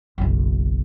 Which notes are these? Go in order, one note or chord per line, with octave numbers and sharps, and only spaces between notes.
F#1 B1